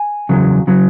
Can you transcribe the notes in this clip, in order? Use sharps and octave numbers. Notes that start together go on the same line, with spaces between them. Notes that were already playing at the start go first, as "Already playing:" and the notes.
Already playing: G#5
E2 C#3 F#3
C#3 F#3